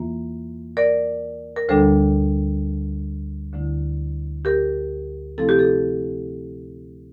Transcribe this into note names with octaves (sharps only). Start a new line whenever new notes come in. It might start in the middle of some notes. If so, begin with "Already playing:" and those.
Already playing: E2 E3 A#3 F4
A#4 D5
A#4
D2 D3 G3 D4 A4 C5
D2 D3 A3 E4
G4 A#4
C3 F3 A3 C4 E4 A4
G4
A4